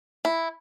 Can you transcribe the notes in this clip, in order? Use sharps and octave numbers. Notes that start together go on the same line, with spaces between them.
E4